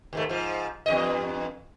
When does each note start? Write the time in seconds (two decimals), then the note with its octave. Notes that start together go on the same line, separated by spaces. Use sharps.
0.13 D#2 G#2 A3
0.29 G#2 F3
0.86 E2 G2 D#5